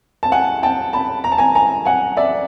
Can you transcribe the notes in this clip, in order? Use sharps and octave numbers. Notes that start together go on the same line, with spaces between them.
A5
F#5 G#5
G5 A5
A5 B5
A#5
A5
G#5 A#5
G#5 A#5
F#5 G#5
D5 E5